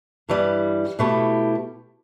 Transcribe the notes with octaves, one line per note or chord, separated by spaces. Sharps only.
G2 E3 G3
B2 A3 E4 G4